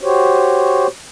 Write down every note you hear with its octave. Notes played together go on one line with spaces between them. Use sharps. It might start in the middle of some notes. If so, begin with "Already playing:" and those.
F#4 G4 C5 C#5